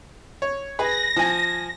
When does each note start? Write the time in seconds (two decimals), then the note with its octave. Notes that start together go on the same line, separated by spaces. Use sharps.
0.42 C#5
0.79 G#4 B4 A#6
1.16 F3 G#5